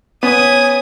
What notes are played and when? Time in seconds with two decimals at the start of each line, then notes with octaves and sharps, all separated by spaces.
0.23 B3 C#4 G#5 D#6